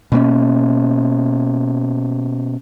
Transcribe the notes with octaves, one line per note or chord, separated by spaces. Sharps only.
B2 A#3 B3 C#4